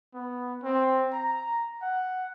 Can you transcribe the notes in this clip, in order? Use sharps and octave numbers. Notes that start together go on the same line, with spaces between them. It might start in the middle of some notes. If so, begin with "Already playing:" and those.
B3
C4
A#5
F#5